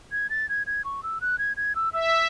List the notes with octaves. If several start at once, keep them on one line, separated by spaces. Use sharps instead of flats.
G#6
A6
G#6
G#6
C#6
E6
F#6
G#6
G#6
E6
E5 E6